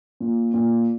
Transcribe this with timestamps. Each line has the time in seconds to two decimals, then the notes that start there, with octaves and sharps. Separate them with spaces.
0.20 A#2
0.54 A#2